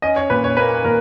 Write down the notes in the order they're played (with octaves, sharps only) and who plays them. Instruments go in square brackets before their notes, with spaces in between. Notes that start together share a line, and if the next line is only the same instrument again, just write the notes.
[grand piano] C#4 D#5
C#5
A#2 B4
C#5
A#3 B4
A#2 A#4